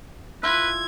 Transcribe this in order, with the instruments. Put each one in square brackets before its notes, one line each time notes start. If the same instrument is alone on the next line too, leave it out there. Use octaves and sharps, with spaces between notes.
[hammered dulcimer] E4 F4 [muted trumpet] B4 [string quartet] G#6